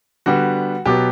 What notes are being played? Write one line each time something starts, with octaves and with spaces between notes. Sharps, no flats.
D3 G3 B3 F#4
B2 F#3 B3 G4